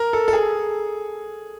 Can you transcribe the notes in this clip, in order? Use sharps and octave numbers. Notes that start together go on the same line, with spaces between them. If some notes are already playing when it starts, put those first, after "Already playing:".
Already playing: A#4
A4
A4
G#4